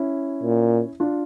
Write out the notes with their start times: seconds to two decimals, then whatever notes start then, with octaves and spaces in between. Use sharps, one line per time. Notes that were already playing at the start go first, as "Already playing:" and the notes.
Already playing: C#4 E4
0.43 A#2
1.00 D4 F4